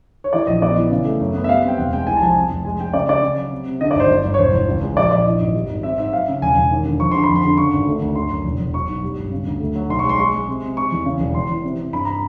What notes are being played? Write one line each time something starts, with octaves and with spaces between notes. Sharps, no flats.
C#5
E3 D5
A#1 D#5
B3 D5
E3
C#3
A3
F#2
B3
E5
G3 F5
C4 G5
E1 F#5
G#3 G5
C2 G#5
A5
F3 G#5
C3
F1
G#3 G#5
G#3 G5
C#3 D5
C#3 D5
C#3
F#3
C3
C3
D3 D#5
D5
G#1 C5
G1
G1
C#5
E1 C5
E2
C#2
G#3
A#1 D5
A#1 D5
E3 D#5
G#1
G3
G#1
C4 E5
G#2 E5
F#3 F5
C#3
E1 G#5
E1
D#2
D3
F3 C#6
D3 C6
B5
F2
C6
D3
C#3 C#6
G#1
A3
D2
D3 C6
F#2
E1
E1
F#3 C#6
B1
G3
G1
C#3
D2
A3
F#3
B1 C6
C#6
G#3
C6
G#3 C#6
G#3
C3
C3
G#3 C#6
E2
C#3
E1
E2 C6
E3
C3
C3
G2 B5
A#5